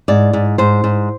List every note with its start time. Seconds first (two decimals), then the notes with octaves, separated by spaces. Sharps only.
0.08 G#2 D5
0.33 G#2
0.58 G#2 C5
0.84 G#2